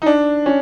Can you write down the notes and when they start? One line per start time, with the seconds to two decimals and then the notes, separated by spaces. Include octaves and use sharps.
0.02 D#4
0.06 D4
0.46 C#4